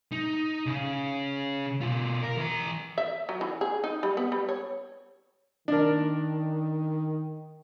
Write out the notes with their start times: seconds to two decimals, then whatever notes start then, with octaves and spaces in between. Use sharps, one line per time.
0.12 D#4
0.66 C#3 C#4
1.81 B2 F4
2.22 A#4
2.37 E3 A#5
2.98 E5
3.29 F#3
3.41 E3
3.61 G#4
3.84 D#4
4.03 G3
4.17 B3
4.32 G3
4.49 C#5
5.68 D#3 D4 A#4